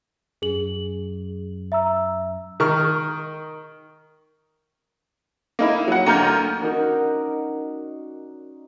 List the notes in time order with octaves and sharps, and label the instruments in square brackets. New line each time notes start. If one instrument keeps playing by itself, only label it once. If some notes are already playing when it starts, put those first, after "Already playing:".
[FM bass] F#2 [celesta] G#4 F#7
[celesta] E5 A#5 E6
[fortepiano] D#3 C#6 F6
[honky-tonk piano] A#3 D#4 E4
F#3 F#5
D2 A#3 A#5 F6 G6
[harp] C#4 D#4 F#4 A#4 D5